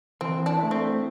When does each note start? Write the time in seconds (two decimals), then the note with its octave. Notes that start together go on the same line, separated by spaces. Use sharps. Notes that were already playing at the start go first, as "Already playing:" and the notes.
0.21 E3 C4
0.46 D4
0.59 A3 E4
0.71 C4